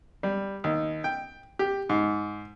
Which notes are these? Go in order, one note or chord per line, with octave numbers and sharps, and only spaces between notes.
G3
D#2
G5
G4
G#2